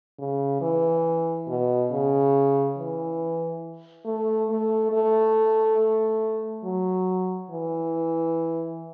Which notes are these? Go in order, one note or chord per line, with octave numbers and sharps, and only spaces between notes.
C#3
E3
B2
C#3
E3
A3
A3
A3
F#3
E3